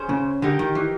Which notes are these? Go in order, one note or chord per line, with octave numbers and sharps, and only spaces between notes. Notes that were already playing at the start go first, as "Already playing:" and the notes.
Already playing: C#4 G#4 C5
C#3
D3 D#4 G4 A#4
D#3
E3